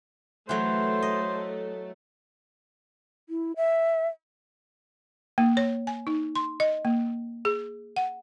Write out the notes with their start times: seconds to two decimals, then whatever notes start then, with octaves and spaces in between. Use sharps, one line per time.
0.49 E3 F#3 A3 C5
1.02 D#5
3.29 E4
3.56 E5
5.38 A#3
5.57 C#5
5.87 G#5
6.07 D#4
6.36 C6
6.60 D#5
6.85 A#3
7.45 G#4
7.96 F#5